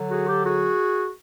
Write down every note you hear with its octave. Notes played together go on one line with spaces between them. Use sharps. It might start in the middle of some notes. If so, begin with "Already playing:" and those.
Already playing: D3 F#3
F#4 G#4
G4 A4
F#4 G#4